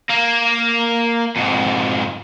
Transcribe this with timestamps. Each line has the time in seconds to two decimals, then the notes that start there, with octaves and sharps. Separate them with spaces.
0.10 A#3
1.37 F2 G#2